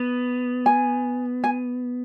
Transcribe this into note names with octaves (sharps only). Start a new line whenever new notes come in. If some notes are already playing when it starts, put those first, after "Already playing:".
Already playing: B3
G#5
G#5